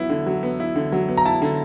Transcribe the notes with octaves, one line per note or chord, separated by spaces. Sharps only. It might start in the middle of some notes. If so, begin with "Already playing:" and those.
Already playing: F#3 B3 E4
D3
F#3
B3
E4
D3
F#3
B3
A#5
E4 A5
D3